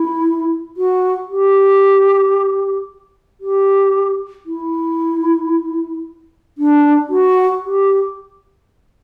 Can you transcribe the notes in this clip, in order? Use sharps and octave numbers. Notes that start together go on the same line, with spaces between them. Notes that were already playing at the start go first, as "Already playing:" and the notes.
Already playing: E4
F#4
G4
G4
E4
D4
F#4
G4